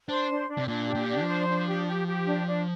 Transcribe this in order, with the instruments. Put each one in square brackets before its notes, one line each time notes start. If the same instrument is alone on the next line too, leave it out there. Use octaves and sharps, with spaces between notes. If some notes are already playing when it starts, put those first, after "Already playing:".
[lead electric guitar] D4 [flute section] C5
[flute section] D4
D4
[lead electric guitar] C3
[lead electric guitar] A#2 [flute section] D4
[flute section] G4
[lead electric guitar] A#2
[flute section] D4
[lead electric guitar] F3
[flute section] C5
D4
G4
G4
G4
D4
D4